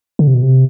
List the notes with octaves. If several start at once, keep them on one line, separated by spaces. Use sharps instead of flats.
D3
C3
B2
C3